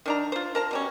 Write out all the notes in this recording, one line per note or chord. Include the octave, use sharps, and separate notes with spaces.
D#3 D4 A#5
F4 C5
A#4 A5 A#5
B2 G3 C#4